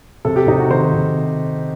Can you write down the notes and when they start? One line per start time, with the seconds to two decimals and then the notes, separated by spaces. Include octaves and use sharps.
0.25 C3 A4
0.36 G4
0.47 C3 D#4
0.59 F#4
0.70 D#3 C5
0.94 C3